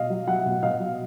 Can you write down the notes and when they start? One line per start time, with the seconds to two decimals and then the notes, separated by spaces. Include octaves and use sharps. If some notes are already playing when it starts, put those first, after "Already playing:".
Already playing: B2 D#5 F5
0.10 F#3
0.27 F#3 E5 F#5
0.45 B2
0.63 B2 D#5 F5
0.80 F#3